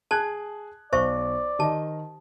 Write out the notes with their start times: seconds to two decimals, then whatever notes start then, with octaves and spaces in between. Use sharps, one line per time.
0.11 G#4 A5 F#6 G#6
0.93 B1 C5 D5 E5 C#6
1.59 D#3 G4 D#5 A5